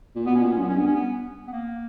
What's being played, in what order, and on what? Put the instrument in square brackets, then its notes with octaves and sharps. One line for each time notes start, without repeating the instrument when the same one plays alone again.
[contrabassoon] A#2
[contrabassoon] B2 [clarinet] B3
[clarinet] C#4
[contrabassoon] A#2 [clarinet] B3
[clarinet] C#4
[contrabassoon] F#2 [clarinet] B3
[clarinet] C#4
[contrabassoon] G2 [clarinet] B3
[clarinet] C#4
B3
B3
A#3